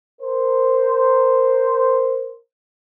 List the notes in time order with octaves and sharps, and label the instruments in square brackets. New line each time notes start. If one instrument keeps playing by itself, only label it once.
[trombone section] A#4 C5